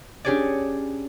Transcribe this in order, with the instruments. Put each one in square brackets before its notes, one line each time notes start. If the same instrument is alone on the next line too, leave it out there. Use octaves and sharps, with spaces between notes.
[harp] C#4 D4 G4 G#4 C#5 D5